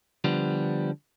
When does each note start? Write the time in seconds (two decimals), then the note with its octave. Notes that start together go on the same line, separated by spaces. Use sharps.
0.24 D3 F3 G3 B3